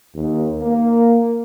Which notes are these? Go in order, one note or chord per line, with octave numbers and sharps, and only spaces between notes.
D#2
A#3